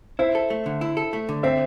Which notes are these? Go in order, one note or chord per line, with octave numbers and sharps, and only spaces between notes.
E4 C5 E5
A4
A3
D3
E4
A4
A3
D3
C4 C5 E5